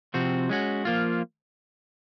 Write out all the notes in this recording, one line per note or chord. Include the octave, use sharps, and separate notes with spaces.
C3 F3 C4 F#4
G#3 C#4 F#4
F3 A#3 F4